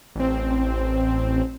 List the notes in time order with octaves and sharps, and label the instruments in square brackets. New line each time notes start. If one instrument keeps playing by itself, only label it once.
[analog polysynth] A1 C4